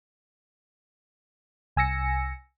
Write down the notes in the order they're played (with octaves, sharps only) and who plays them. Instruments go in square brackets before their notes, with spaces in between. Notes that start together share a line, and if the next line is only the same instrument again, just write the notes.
[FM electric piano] C2 G#5 E6 A#6 C#7